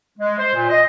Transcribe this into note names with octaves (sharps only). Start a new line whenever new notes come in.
G#3
C5
A#2
D#5